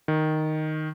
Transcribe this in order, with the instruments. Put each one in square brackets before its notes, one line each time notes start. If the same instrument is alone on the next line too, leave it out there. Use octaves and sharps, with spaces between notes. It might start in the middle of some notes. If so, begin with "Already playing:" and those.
[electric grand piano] D#3